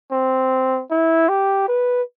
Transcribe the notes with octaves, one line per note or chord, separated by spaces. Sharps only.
C4
E4
G4
B4